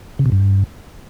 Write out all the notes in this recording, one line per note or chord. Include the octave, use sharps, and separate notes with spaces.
C#3
B2
G2